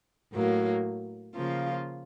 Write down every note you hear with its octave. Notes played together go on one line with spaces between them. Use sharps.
A2 F#3 A#3
C#3 F3 A#3 F4